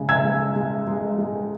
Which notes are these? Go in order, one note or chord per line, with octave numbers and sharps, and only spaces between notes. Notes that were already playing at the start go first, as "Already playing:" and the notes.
Already playing: C#3 G#3
E6 G#6
G#3
G#3
G#3
G#3